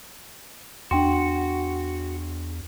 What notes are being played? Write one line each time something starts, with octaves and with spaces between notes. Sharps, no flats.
E2 D4 F#4 G5 C6